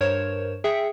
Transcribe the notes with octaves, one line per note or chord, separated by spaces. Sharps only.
G2 A#4 C5 C#5 E7
G#4 E5 G5 C#7